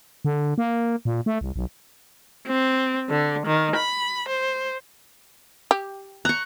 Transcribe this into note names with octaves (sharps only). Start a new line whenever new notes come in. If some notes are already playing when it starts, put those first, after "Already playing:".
D3
A#3
A#2
A3
C2
B1
C4
D3
D#3
B5
C5
G4
A#5 C#6 F#6